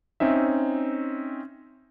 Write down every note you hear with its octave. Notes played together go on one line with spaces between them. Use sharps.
C4 C#4 D#4 E5